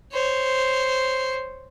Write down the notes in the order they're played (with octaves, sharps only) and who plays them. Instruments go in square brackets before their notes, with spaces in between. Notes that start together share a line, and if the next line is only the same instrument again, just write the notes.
[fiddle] C5 C#5